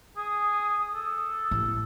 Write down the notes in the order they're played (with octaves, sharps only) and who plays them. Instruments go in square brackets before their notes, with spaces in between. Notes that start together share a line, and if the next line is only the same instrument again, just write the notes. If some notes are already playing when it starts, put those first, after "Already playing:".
[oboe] G#4 [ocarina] D#6
[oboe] A4
[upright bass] A1